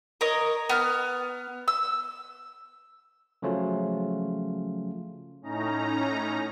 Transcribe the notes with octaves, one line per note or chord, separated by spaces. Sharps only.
A#4 C#5 D#5
B3 F6
E6
C#3 F3 F#3 A3 C#4 F4
A2 C#4 D#4 A#5